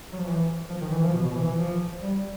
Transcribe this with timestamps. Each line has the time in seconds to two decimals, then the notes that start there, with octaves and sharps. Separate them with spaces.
0.13 F#3
0.19 F3
0.27 E3
0.70 F3
0.81 D#3
0.92 E3
1.04 F3
1.14 B2
1.25 B2
1.35 E3
1.47 E3
1.58 F3
2.02 G3